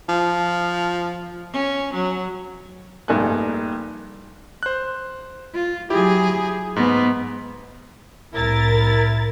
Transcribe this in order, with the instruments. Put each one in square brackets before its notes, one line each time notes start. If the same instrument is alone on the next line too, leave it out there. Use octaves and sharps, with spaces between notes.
[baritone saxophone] F3
[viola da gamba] C#4
F#3
[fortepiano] A#1 G2 A3 D#4 G#5 F#6
[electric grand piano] C5 F#6
[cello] F4
[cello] F#3 G#4 [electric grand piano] E4 G4
[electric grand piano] G#2 [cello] B3
[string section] C2 A#4 A6 [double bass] A2 [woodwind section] E4